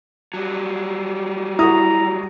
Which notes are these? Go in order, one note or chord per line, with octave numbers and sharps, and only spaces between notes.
F#3 G3
E4 F#4 A#5 D#6